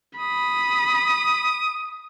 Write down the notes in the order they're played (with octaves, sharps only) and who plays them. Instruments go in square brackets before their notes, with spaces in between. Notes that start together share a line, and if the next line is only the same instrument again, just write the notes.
[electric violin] B5 [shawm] D#6